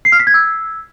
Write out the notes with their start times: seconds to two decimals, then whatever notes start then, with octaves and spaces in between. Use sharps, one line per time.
0.05 C7
0.12 F6
0.20 B6
0.27 G#6
0.34 E6